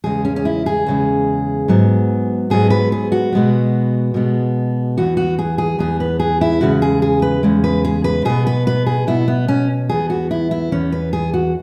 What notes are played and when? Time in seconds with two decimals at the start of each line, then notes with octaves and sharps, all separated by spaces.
0.04 E2 C#3 G#3 G#4
0.25 C#4
0.36 C#4
0.45 E4
0.66 G#4
0.87 E2 C#3 G#3
1.68 G#2 F#3 B3
2.50 G#2 F#3 B3 G#4
2.70 B4
2.92 G#4
3.12 F#4
3.32 B2 G#3 B3
4.14 B2 G#3 B3
4.97 E2 E3 B3 F#4
5.17 F#4
5.39 G#4
5.58 G#4
5.79 E2 E3 B3 G#4
6.00 B4
6.20 G#4
6.41 E4
6.61 E2 C#3 G#3 F#4
6.82 G#4
7.02 G#4
7.22 B4
7.43 E2 C#3 G#3
7.64 B4
7.85 G#4
8.04 B4
8.25 B2 B3 G#4
8.47 B4
8.67 B4
8.86 G#4
9.07 B2 B3 E4
9.28 B3
9.48 C#4
9.89 E2 E3 B3 G#4
10.10 F#4
10.31 E4
10.51 E4
10.71 E2 E3 B3 C#4
10.92 B4
11.13 G#4
11.33 F#4